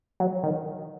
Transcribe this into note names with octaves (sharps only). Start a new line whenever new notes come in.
F#3
D#3